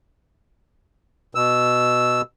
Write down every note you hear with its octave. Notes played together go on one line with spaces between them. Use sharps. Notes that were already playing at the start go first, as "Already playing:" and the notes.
B2 E6